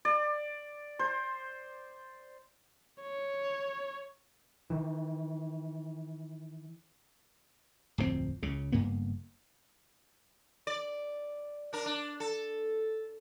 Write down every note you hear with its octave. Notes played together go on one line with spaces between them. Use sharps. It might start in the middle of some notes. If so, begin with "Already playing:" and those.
D5
C5
C#5
D#3 E3
D1 F2 E3 C4
C#2 C#3
F#1 G2 A#3 B3
D5
D4 A#4
D4
A4